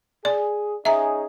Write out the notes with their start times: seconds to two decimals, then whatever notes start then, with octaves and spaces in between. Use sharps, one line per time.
0.25 G#4 D5
0.85 C#4 D#4 G#4 E5 A#5